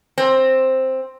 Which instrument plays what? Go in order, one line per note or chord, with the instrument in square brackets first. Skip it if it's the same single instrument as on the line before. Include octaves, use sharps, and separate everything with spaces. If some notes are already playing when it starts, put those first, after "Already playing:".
[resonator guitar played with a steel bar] C4